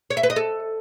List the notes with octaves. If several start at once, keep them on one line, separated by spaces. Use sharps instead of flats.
C#5
E5
B4
D#5
A4